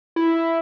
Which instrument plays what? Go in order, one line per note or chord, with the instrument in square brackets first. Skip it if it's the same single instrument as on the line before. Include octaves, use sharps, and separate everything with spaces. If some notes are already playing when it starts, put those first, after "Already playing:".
[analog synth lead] E4